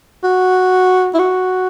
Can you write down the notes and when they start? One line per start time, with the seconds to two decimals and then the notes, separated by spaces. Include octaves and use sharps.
0.24 F#4
1.14 E4
1.19 F#4